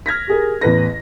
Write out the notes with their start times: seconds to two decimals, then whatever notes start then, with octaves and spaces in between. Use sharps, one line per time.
0.06 F6 G#6 A#6 B6
0.27 G4 G#4 A#4
0.61 A1 E2 B4 A#6